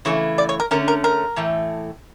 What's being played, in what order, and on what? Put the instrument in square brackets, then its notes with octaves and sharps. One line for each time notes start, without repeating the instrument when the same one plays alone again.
[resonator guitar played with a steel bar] C#3 E3 A3 [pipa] C#5
[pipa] D5
C#5
A#4
[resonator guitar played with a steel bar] D3 A3 C#4 [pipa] A#4
[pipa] A#4
A#4
[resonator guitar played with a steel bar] A2 E3 A3